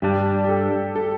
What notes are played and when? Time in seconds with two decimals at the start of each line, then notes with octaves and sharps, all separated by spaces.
0.02 G2 G3 D4 G4
0.44 G4
0.49 A4
0.96 A4